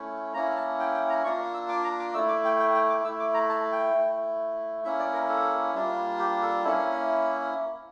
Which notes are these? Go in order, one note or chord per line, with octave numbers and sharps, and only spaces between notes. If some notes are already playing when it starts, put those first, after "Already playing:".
Already playing: A3 C#4 E4
A#3 C#4 E4 A#5
A5
G5
G5
A#5
A#3 D4 F4 C#6
E6
D6
A#5
D6
A3 E4 E6
D6
G5
G5
G5
D6
A3 E4 E6
D6
A#5
A5
G5
A3 E4
A#3 C#4 E4 E5
D5
A#4
A4
G3 A#3 D4 F4
G4
A4
A#3 C#4 E4 A4